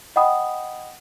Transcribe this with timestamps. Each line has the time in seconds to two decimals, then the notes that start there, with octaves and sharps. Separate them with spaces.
0.16 D#5 F#5 G5 B5 D#6